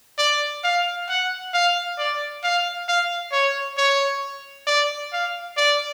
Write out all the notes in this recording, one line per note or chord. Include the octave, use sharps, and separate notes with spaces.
D5
F5
F#5
F5
D5
F5
F5
C#5
C#5
D5
F5
D5